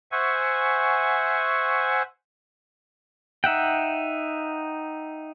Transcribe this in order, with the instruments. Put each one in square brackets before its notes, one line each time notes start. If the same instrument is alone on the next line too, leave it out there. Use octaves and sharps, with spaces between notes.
[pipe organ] C5 E5 F#5 G#5 C#6
[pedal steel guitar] D#4 E5 F#5 G5